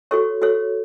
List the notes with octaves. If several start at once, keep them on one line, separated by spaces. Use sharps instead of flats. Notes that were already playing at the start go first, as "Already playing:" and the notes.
F#4 A4 C#5 C#6
F#4 A4 C#5